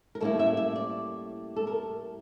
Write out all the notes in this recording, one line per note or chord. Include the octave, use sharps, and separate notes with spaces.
A#4
A2 G3 A#3 C#4 E4 A4
E5
E5
D5
A4
A#4